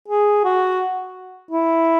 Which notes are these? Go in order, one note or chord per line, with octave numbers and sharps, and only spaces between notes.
G#4
F#4
E4